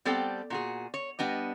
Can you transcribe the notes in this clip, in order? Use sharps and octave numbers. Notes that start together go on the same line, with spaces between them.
G3 B3 C4 A4 D5 G5
A#2 F#4 G#4
C#5
G3 B3 D4 D#5